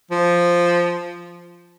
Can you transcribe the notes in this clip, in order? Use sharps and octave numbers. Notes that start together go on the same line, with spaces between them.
F3